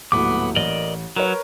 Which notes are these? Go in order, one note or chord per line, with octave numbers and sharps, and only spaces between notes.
D#1 A2 F#3 B3 D6
A1 A#4 D5 D#5
F#3 A#4 B4 C#5